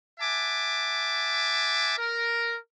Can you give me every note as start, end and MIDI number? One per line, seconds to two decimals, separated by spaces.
0.20 1.96 76
0.20 1.96 78
0.20 1.96 80
0.20 1.96 81
0.20 1.96 86
1.97 2.57 70